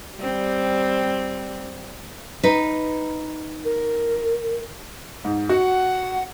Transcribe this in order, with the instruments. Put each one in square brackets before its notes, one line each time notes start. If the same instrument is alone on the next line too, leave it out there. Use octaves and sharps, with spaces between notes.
[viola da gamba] G3 C4
[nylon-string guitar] D#4 B4
[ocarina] A#4
[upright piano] G#2
[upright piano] F#4 [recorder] F#5